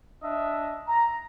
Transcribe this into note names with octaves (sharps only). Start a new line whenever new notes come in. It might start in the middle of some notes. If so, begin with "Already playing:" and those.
D4 D#5 E5
A#5